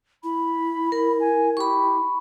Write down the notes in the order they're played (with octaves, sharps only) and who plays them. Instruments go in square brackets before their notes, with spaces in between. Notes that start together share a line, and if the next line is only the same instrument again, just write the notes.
[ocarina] E4 [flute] B5
[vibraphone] A#4
[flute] G#5
[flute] G4 [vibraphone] B5 C#6